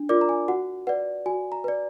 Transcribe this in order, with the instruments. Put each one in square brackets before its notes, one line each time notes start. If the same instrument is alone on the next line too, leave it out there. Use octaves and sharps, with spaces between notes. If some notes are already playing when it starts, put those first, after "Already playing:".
Already playing: [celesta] D4
F4 A#4 D5 D6
A#5
G#5
F#4 F#5
B4 D5 F#5
F#4 G#5
A#5
B4 D5